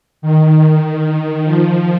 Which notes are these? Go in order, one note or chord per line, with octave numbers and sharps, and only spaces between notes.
D#3
F3